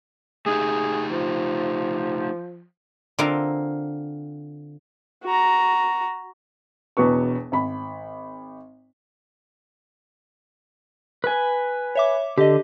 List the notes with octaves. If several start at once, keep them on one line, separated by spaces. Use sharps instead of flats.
A3 D#4 G4 G#4
F3
D3 C4 F4 A#4 F5
F#4 A#5
E1 E2 B2 B4 C#6
G#1 B5
B4 G#5
C#5 E5 D6
D3 G4 D#5